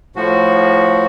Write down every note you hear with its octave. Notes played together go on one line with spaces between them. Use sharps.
A2 F3 F#4